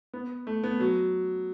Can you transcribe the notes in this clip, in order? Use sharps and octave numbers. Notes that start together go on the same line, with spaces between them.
B3
A3
B3
F#3